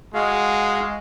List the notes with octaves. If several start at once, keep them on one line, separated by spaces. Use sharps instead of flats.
G#3 F#4 F5